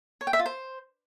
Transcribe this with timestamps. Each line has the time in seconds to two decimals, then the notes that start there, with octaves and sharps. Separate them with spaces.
0.21 C#5
0.27 G5
0.33 E5
0.39 F4
0.46 C5